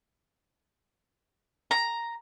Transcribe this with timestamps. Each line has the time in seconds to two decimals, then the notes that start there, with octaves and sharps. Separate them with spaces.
1.71 A#5